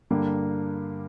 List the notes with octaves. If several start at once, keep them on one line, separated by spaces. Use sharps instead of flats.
G2 D3 G3 A#3